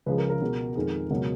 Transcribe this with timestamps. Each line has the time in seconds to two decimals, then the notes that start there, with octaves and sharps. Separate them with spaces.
0.06 C#2 C#3 F3 G#3 B4
0.18 A#4
0.30 A#4
0.41 C#2 B2 G#3
0.75 F2 D#3 G#3
1.10 C#2 B2 F#3 A#4